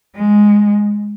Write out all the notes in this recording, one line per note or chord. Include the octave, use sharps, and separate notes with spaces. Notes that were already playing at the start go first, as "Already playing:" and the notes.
G#3